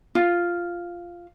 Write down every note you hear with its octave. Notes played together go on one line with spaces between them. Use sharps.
F4